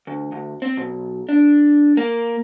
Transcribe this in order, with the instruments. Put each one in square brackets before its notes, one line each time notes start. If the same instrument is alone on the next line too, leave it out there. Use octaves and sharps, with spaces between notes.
[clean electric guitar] D2
D2
C4
B1
D4
A#3